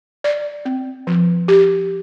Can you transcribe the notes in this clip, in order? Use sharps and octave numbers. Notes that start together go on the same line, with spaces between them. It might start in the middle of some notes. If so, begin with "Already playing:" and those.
D5
C4
F3
G4